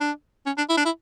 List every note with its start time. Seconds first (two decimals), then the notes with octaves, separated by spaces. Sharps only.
0.01 D4
0.46 C#4
0.58 D4
0.69 E4
0.77 D4
0.85 E4